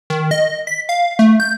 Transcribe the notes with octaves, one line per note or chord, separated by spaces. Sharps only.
D#3
D#5
B6
F5
A3
G6